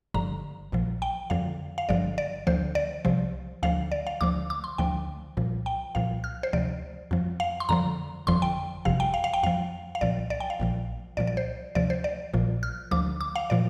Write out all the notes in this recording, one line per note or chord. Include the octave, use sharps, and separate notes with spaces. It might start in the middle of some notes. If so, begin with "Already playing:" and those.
G1 G2 D3 F3 A#5
A#1 A#2 F3
G5
F2 D3 F3 F5
F5
G1 G2 D3 F3 D5
D5
D2 D3 F3 C5
D5
C2 C3 F3
D2 D3 F3 F5
D5
F5
D2 D3 F3 D6
D6
C6
D2 D3 F3 G5
C2 A#2 F3
G5
C2 A#2 F3 F5
F6
C5
D2 C3 F3 D5
F2 F3
F5
C6
F2 D3 F3 A#5
G1 F2 D3 F3 C6
G5
G1 F2 C3 F3 F5
G5
F5
F5
G5
F2 F3 F5
F5
C2 A#2 F3 D5
D5
G5
F5
A#1 A#2 F3
C2 A#2 F3 D5
D5
C5
D2 C3 F3 D5
C5
D5
A#1 A#2 F3
F6
D2 D3 F3 D6
D6
F5
A#2 F3 D5